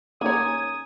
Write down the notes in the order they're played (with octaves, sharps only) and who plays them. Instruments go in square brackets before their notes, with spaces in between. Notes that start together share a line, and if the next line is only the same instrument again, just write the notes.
[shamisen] A#3 C#5 [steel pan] C#4 D#4 G#5 [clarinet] D#6 [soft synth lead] G#6